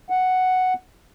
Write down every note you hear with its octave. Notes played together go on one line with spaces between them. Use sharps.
F#5